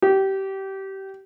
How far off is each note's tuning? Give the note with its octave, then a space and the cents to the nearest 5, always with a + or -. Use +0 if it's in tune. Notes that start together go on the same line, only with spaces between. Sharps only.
G4 -25